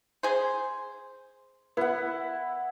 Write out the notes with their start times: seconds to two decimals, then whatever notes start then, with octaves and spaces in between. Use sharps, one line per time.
0.23 G#4 C5
1.77 B3 E4 F#5